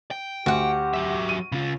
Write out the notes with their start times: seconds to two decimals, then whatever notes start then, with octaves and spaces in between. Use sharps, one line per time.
0.11 G5
0.46 D2 F#4 G4 F#5
0.94 F#3 E5
1.29 D#7
1.52 C#3 F4